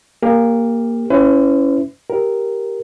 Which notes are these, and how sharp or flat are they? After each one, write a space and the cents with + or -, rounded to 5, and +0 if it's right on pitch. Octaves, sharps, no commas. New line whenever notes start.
A#3 +0 G4 +35
C#4 +0 E4 +0 B4 +40
G4 +0 A#4 +0